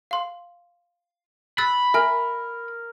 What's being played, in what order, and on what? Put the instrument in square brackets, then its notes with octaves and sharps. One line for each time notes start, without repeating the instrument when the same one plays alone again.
[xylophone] F5 C6
[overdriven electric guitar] B5 [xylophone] E6 F#6 A6
[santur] A#4 [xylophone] E5 G#5